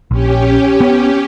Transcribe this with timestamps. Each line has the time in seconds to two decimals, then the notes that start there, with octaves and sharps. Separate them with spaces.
0.11 A#1 C#4 G4
0.81 B3